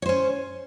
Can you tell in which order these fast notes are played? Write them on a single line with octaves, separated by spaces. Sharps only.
C#5 C5 C#4